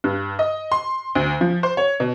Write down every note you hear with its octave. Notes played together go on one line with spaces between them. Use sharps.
G2
D#5
C6
D2
F3
C5
C#5
B2